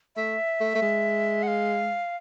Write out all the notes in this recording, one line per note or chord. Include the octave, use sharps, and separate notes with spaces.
A3 E5
A3
A3
G#3
F#5
F5